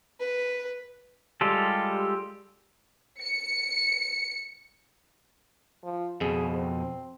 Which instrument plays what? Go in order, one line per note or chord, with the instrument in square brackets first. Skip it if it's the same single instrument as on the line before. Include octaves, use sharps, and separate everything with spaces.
[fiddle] B4
[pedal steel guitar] G3 G#3 F4 G4 A4
[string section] C#7
[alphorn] F3
[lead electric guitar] F2 B2 [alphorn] G#4
[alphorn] C4